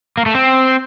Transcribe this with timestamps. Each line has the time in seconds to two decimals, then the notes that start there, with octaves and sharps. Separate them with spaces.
0.17 A#3
0.26 A3
0.35 C4